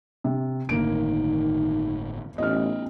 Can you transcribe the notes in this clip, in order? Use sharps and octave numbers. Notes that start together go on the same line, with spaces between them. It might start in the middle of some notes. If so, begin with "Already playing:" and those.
C3
G1 A2 D3 D#3 A#3 D7
A1 B3 C#4 D#5 F6